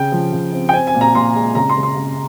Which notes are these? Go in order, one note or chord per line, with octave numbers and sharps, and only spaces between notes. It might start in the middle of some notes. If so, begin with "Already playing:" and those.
Already playing: C#3 G5
F3
C#3
C4
G5
C4 G#5
G#5
A#2
A#5
A#2 C6
G#3
C#3 A#5
C6
C#3
C6
C#3